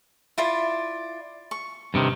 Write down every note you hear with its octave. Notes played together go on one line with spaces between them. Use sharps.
E4 F4 D5
C#6
G2 C3 D#3